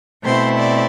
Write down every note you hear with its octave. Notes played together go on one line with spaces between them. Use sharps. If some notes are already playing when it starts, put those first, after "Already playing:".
B2 A3 C4 E4 C5
D5